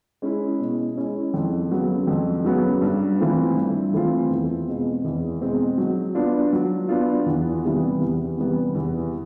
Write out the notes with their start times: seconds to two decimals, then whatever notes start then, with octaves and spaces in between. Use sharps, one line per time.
0.22 G#3 C#4 E4
0.60 B2
0.97 G#3 C#4 E4
1.34 F2
1.70 C#3 F#3 B3
2.07 F2
2.44 C#3 F#3 B3
2.82 G2
3.19 E3 A3 C4 F4
3.56 G2
3.93 E3 A3 C4 F4
4.30 E2
4.67 B2 G#3 C4
5.04 E2
5.41 B2 G#3 C4
5.78 F#3
6.15 B3 D4 F4
6.53 F#3
6.89 B3 D4 F4
7.26 E2
7.63 C3 E3 G3 B3
8.00 E2
8.37 C3 E3 G3 B3
8.74 E2